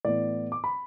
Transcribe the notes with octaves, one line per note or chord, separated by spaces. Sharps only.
A2 E3 B3 D5
D6
B5